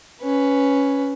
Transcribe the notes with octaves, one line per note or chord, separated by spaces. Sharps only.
C#4 B4